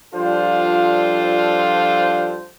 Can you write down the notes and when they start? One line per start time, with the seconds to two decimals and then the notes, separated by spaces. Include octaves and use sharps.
0.15 F3 G3 D4 F4 A4 C5